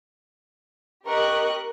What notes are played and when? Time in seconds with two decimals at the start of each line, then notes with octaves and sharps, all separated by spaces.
1.06 G4 A#4 D#5 C#6 F#6